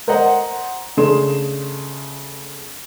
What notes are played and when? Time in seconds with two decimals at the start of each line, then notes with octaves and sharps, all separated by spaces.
0.08 A#4 C5 D5 D#5 F#5 A#5
0.97 C#3 A3 D4 G#4 C6 E7